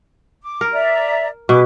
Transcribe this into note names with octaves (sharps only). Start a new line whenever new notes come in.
D6
A#4
D5 E5 A#5
B2 G#4 B4 D6